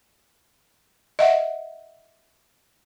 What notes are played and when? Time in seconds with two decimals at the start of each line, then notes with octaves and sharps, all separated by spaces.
1.19 D#5 E5 F#5